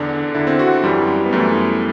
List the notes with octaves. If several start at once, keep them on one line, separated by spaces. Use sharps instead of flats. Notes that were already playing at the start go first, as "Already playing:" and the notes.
Already playing: E2 D3 D4
E2 D3 E4
C4
F#4
F#2 E3 G3
B3
F#2 E3 A3